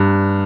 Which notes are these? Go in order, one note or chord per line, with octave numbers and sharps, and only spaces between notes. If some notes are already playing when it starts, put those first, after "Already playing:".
Already playing: G2